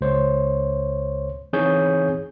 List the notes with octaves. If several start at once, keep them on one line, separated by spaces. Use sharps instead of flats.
C#2 C5 C#5
E3 C4 D#4 G#4 C#5 G6